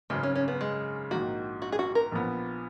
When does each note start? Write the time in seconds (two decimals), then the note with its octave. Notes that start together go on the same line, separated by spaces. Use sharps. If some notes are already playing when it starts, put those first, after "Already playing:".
0.10 G#1 F#2 C#3 G#3
0.23 C#4
0.36 C#4
0.48 B3
0.61 G#3
1.11 A#1 G#2 D#3 A#3 F#4
1.62 F#4
1.72 G#4
1.79 F#4
1.95 A#4
2.12 A#1 A#2 F3 B3